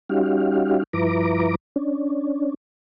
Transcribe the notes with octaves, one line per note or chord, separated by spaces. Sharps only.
G3 C#4 D#4 F#4 G4 F5
G2 F3 E4 B4 A#5 D6
C#4 D4